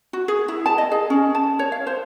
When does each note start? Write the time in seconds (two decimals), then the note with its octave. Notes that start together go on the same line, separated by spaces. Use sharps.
0.13 F#4
0.28 G#4
0.48 E4
0.66 A5
0.78 D#5
0.92 G#4
1.10 C#4
1.35 A5
1.59 C#5
1.72 F5
1.87 C5